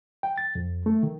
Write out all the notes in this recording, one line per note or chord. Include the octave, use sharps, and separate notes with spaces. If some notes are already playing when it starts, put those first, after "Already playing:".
G5
A6
F2
A3
D#3